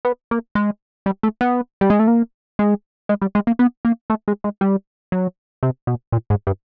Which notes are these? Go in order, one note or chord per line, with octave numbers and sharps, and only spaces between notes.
B3
A#3
G#3
G3
A3
B3
G3
G#3
A3
A#3
G#3
G#3
G3
G#3
A#3
B3
A#3
A3
G#3
G#3
G3
F#3
C3
B2
A#2
G#2
G2